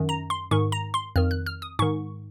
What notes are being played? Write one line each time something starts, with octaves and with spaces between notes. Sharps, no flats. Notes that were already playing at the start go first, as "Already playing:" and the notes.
Already playing: F#2 D#3
A#5
C6
G#2 D#3 C#6
A#5
C6
F2 D#3 F6
F#6
F6
D#6
G#2 D#3 C#6